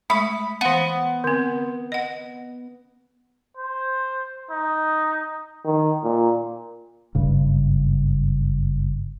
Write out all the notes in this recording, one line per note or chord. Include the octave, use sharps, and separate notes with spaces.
G#3 A3 B5 C#6
E3 B3 F5
D3 C4
D#5 F#5
C5
D#4
D#3
A#2
F#1 G2 C#3